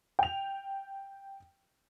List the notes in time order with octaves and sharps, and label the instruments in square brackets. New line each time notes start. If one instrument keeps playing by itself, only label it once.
[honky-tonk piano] G5 F7